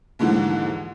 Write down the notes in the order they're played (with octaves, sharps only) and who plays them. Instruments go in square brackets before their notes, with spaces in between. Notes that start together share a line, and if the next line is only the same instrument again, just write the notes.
[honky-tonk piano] D#2 G#2 D3 E3 F3